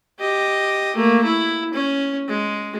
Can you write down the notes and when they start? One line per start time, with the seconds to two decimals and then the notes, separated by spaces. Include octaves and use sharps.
0.20 G4 D#5
0.95 A3 A#3
1.24 E4
1.74 C#4
2.28 G#3